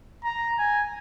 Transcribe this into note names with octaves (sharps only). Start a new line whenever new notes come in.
A#5
G#5